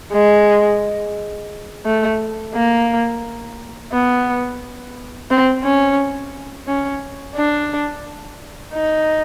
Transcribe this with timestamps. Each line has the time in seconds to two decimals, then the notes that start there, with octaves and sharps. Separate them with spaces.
0.13 G#3
1.85 A3
2.55 A#3
3.93 B3
5.30 C4
5.64 C#4
6.68 C#4
7.36 D4
8.74 D#4